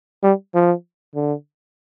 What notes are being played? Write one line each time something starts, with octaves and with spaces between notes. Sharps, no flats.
G3
F3
D3